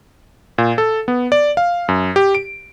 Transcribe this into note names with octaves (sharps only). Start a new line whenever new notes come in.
A#2
A4
B3
D5
F5
F#2
G4
D7